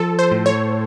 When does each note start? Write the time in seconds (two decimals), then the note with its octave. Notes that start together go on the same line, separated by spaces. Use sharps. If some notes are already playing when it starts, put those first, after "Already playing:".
Already playing: F3 A4
0.19 C5
0.32 A2
0.46 C#5